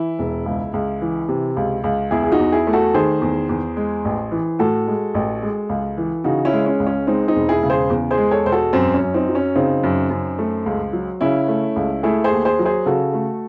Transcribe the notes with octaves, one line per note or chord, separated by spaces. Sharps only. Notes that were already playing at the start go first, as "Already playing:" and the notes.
Already playing: E3 E4
E1
C#2
C#2
E3
C3
C#2
C#2
E2 E4 G#4
G#4
D#4 F#4
E2
E4 G#4
A3
F#4 A4
D#3 G#4 C5
E2
E2
G#3
A1
E3
A2 F#4 A4
G#3
A1
G#3
C#2
E3
C#3 D#4 F#4
C#4 E4
G#3
C#4
C#2
C#4
G#3 C4 D#4
C4 D#4
E1
E4 G#4
C#3
G#4 C5
E2
G#4 C5
G#3
A4 C#5
E1 C5
F#4 A4
F#2 C4
C#4
F#2
C4 D#4
F#3
C#4
C#3 C4 D#4
F#2
F#2
A3
C#2
F#3
C#3 C#4 E4
A3
C#2
A3 E4 G#4
G#4 C5
D#2
G#4 C5
F#3
G#4 C5
C#3 F#4 A4
A3